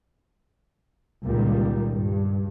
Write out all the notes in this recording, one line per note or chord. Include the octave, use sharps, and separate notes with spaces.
C#2 A#2 D#3 G3 A#3
G2